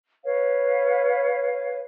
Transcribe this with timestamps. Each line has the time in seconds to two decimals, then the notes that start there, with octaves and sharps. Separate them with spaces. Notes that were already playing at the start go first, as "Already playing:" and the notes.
0.25 B4 C#5 F5